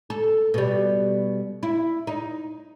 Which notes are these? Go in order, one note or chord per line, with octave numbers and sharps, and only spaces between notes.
A4
B2 G3
E4
D#4